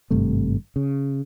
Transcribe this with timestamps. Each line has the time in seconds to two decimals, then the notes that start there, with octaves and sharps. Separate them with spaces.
0.11 G#1 G2 C3 A3
0.76 C#3